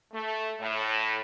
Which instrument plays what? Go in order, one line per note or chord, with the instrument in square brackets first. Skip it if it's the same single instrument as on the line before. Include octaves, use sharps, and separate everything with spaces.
[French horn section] A3
A2